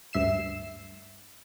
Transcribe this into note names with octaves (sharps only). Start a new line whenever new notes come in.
D2 G2 E5 C7 E7